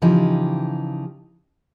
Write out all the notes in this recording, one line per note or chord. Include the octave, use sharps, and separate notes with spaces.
C#3 E3 F3 D#4 G4